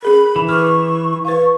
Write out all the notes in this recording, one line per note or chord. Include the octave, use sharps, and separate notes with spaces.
C#4 G#4 A#4 B5
E3
B4 C#6 D6 F6
B4 F5 C#6